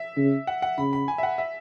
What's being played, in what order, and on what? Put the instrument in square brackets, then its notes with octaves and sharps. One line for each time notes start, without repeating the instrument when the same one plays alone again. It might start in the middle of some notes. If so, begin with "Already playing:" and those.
Already playing: [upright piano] E5
[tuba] C#3
[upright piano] F#5
F#5
[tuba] C#3 [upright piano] B5
[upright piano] B5
G#5
E5
F#5
E5